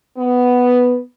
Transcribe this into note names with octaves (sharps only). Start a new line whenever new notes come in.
B3